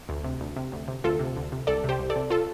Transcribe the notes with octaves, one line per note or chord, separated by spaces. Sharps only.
D2
C3
D2
C3
D2
C3
D2 F4 A4
C3
D2
C3
C2 A4 D5
C3 G4 C5
C2
A4 D5
C3
F4 A4